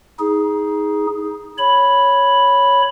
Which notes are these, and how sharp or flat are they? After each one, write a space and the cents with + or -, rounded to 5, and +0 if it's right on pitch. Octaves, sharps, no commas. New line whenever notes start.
D#4 +25 G#4 +0
C#5 +0 B5 +0